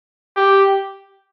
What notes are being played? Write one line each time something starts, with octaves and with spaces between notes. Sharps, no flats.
G4